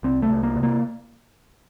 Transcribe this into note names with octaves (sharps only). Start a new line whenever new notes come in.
C2 C4
A3
C2
A#3
C3
A#3